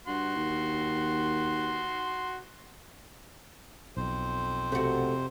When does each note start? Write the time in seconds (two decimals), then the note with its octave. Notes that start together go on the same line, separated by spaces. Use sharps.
0.07 G2 F#4 C6
0.36 D#2
3.97 B1 F2 C5
4.72 C3 A3 F#4